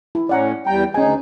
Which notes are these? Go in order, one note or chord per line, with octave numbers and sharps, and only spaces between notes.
E4
A2 C#4 D5 F#5 A#5
E2 G3 G5 A#5
D2 C#4 D#4 G#4 G#5